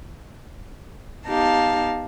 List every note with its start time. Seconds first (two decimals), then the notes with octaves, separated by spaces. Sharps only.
1.27 B3 D#4 G4 F5 A5